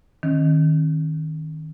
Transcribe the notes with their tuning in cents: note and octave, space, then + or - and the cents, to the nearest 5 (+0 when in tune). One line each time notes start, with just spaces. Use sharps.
D#3 +0 C#4 -40